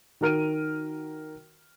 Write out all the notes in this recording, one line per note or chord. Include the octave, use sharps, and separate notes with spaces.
D#3 F#4 A#4 F6 D7 D#7